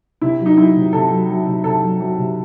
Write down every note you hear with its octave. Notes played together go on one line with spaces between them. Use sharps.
C3 E4
F#3
D#4
F#3 E4
C3
C3 A4
F#3
F#3
C3
C3 A4
F#3
F#3
C3